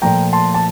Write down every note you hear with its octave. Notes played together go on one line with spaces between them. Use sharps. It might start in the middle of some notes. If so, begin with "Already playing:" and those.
A#2 F3 A3 G5 A#5
A5 C6
A5